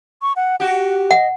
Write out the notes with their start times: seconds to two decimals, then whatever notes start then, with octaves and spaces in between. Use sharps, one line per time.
0.22 C#6
0.36 F#5
0.60 F#4 G4 F#5
1.11 D#5 F#5